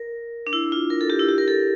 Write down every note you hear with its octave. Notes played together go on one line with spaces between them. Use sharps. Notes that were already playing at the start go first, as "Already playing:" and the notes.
Already playing: A#4
D4
E4
F4
A#4
A4
G4
E4
G4
A#4
A4